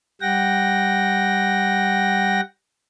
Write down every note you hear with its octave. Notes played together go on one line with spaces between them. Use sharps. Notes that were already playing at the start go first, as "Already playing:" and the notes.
G3 F#5 G5 A#6